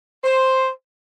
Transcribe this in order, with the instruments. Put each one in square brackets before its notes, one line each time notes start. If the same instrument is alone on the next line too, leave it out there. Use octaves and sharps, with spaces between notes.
[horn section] C5